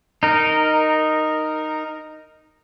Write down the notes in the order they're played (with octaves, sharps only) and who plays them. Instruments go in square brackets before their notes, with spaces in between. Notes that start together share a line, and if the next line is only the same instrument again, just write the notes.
[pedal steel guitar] D#4 A#4